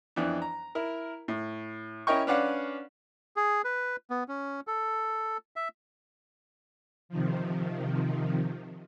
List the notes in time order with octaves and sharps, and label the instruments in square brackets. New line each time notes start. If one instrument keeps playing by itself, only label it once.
[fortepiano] F2 E3 B3 D4
A#5
E4 A#4
A2
C#4 E4 A#4 D#5 G5 C#6
C#4 D4 B4 D5 F5 F#5
[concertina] G#4
B4
B3
C#4
A4
E5
[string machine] C3 D#3 F3